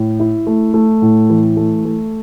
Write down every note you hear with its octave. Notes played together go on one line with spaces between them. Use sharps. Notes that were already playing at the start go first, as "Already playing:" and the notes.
Already playing: A2
E4
A3
A3
A2
E3
A3
A3